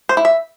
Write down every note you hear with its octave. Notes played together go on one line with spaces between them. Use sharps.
C5
E4
E5